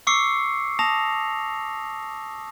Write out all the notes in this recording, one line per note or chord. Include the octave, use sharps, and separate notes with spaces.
C#6 D6 E6 C7 C#7
A5 D#6 A#6 F7